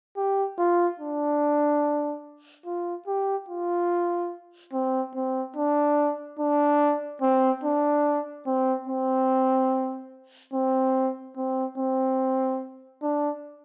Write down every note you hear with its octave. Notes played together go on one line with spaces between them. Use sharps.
G4
F4
D4
F4
G4
F4
C4
C4
D4
D4
C4
D4
C4
C4
C4
C4
C4
D4